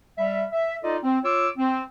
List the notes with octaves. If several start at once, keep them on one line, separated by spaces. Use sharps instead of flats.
G3 E5
E5
D#4 F4 A4 D5 D#5
C4
F4 C#5 D6 E6
C4